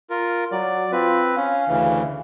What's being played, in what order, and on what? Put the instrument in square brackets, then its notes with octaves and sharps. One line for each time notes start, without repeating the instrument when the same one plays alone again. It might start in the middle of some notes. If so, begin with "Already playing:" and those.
[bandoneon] F4 A#4
[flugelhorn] F#3 [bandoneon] D5
[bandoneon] C4 B4 [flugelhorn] F4
[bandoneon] C#4 [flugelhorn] F5
[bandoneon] D2 C#3 E3